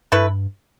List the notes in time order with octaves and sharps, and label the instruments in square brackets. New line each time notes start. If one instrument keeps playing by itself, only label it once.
[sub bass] G2 [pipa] A3 E4 B4